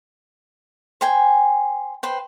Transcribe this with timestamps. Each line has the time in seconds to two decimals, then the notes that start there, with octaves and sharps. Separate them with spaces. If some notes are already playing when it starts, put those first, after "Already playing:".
1.01 C5 G5 G#5
2.03 B4 C5 G5